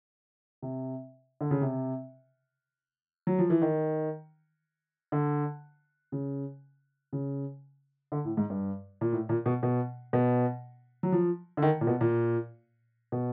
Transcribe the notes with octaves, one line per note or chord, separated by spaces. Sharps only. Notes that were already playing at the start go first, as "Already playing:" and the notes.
C3
D3
C#3
C3
F#3
F3
E3
D#3
D3
C#3
C#3
D3
A2
G#2
G2
A#2
A2
A#2
B2
B2
B2
F#3
F3
D3
D#3
A#2
B2
A#2
B2